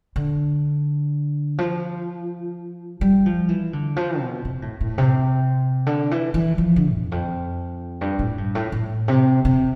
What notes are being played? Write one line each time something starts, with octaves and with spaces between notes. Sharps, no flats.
D3
F3
G3
F3
E3
D3
F3
B2
C3
A2
A2
C3
D3
E3
E3
F3
D3
E2
F2
G2
A2
G2
A2
A2
C3
C3